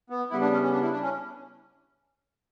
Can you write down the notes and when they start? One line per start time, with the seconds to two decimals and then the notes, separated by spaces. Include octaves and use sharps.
0.10 B3
0.30 C#3 G3 B3 E4
0.41 D4
0.52 C#4
0.62 C#4
0.72 D4
0.82 E4
0.92 D4
1.02 C#4